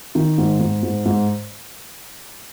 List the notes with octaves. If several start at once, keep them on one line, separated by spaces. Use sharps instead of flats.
D#3
G#2
G#2
G#2
G#2